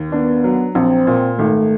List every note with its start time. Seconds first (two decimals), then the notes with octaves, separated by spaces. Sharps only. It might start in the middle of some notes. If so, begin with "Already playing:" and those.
Already playing: D#2
0.12 B3 D4
0.44 F#3
0.75 A#1 C4
1.07 A#2
1.39 G#1 A3